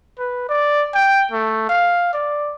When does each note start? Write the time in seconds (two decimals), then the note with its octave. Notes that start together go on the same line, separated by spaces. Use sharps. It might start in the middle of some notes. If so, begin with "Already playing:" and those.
0.18 B4
0.49 D5
0.94 G5
1.32 A3
1.69 F5
2.13 D5